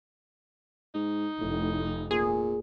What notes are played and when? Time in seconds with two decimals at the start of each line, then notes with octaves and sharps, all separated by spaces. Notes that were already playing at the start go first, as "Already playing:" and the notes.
0.95 G#2 D#4
1.41 F1 A2
2.11 A#2 G#4